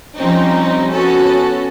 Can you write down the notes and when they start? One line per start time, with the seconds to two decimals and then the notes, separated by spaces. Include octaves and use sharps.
0.18 F3 G3 C4 C#4 D#4
0.94 B3 C#4 F#4 A4